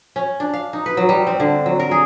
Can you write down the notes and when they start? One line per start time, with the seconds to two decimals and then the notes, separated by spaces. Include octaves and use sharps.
0.16 C#4
0.40 D4
0.53 F5
0.73 D#4
0.86 B4
0.97 F#3
1.09 G3
1.27 C4
1.40 D3
1.66 F#3
1.80 A#4
1.91 G#4